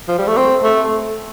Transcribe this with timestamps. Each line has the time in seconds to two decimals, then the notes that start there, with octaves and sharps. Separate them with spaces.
0.08 F3
0.18 G3
0.27 A3
0.37 C4
0.64 A3